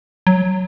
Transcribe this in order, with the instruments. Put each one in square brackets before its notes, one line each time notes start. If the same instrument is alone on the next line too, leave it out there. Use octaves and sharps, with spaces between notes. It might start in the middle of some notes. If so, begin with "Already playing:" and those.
[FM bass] F#3